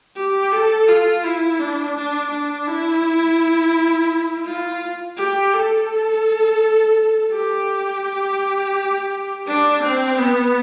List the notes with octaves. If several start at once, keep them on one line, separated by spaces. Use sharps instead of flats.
G4
A4
F4
E4
D4
D4
D4
E4
F4
G4
A4
G4
D4
C4
B3